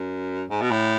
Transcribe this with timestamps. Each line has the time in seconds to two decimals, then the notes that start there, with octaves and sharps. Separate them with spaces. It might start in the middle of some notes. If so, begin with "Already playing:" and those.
Already playing: F#2
0.50 G#2
0.61 B2
0.71 A2